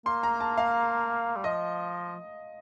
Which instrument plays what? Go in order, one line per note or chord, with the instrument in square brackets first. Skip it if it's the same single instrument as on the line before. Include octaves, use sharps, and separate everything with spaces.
[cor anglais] A#3 [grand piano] C6
[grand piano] A#5
A5
F5
[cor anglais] G3
[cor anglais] F3 [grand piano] D#5